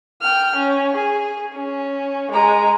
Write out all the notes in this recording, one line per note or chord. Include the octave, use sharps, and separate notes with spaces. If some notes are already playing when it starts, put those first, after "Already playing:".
G5 F6
C#4
G#4
C#4
G#3 A#5